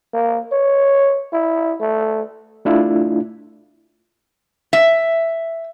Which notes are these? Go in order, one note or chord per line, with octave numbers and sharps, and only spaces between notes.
A#3
C#5
E4
A3
A3 D4 E4 F4
E5